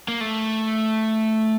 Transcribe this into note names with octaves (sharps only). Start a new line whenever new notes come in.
A#3
A3